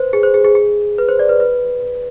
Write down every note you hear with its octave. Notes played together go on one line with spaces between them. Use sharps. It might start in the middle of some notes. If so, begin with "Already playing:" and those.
Already playing: B4 C5
G#4
C5
G#4
G#4
G#4
B4
C5
D5
B4
B4